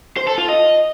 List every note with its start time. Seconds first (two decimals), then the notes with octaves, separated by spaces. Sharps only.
0.17 C5
0.27 A4
0.38 F4
0.48 D#5